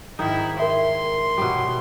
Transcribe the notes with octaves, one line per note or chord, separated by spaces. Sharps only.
G#2 D#3 D#4 E4
A#4 E5 C6
B2 F#3 G3